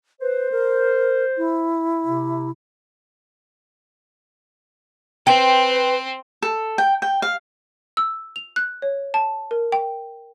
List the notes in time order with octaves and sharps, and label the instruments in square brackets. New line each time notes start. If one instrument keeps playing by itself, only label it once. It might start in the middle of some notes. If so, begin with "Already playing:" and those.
[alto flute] B4 [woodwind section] C5
[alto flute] A#4
E4
[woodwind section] C3
[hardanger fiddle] C4 C5 [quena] B4 [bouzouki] G5
[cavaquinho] A4
G5
G5
F5
[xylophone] E6
F7
F#6
C#5
A5
A#4
G5